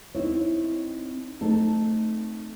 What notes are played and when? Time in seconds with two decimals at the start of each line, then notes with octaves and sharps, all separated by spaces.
0.15 C4 D#4 E4 C#5
1.41 A3 C4 D#4 A4